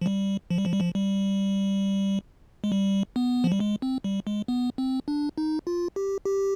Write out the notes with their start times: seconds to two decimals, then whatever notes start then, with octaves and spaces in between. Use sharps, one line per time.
0.01 F3
0.06 G3
0.50 F3
0.58 G3
0.65 F3
0.73 G3
0.80 F3
0.95 G3
2.64 G#3
2.72 G3
3.16 B3
3.44 F3
3.52 G3
3.60 G#3
3.82 C4
4.04 G3
4.27 G#3
4.48 B3
4.78 C4
5.08 D4
5.38 D#4
5.67 F4
5.96 G4
6.25 G4